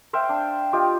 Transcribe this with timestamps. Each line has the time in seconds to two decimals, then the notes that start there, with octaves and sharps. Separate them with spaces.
0.13 C5 E5 F5 G5
0.29 D4
0.73 F4 G4 D#5